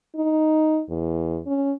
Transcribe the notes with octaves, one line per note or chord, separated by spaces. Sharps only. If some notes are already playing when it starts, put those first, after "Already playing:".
D#4
E2
C#4